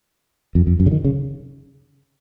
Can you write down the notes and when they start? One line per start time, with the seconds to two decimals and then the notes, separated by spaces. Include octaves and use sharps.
0.55 F2
0.67 F2
0.80 F#2
0.86 C#3
0.91 D#3
1.05 C#3